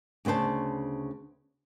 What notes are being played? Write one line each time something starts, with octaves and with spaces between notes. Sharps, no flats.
D2 C#3 B3 C5 A5